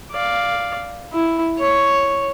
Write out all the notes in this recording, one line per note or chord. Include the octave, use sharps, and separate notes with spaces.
D5 F5
E4
C#5